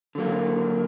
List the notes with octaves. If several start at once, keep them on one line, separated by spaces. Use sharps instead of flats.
D3 F#3 A#3